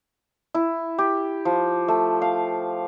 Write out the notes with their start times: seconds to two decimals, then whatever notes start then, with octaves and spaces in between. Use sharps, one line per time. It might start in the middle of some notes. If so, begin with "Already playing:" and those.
0.55 E4
0.98 G4
1.45 F3
1.88 A3
2.22 F5